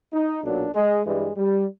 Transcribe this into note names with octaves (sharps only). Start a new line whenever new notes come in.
D#4
B1 A#2 F#3 D4
G#3
G2 E3 G3 G#3
G3